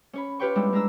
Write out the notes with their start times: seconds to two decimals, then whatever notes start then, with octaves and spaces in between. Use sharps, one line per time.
0.13 C#4 C#5 B5
0.39 F4 G4 B4 C#5 G5 C#6
0.55 G3 G#3 B3 D4 E4
0.73 G#3 D4 A#5 E6